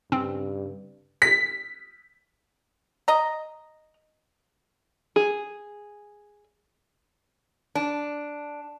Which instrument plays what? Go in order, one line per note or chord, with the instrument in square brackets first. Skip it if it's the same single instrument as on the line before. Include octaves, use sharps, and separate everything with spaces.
[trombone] G2 [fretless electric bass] C#3 [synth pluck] C4
[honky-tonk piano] B6
[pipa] D#5 A#5
[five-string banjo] G#4
[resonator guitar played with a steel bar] D4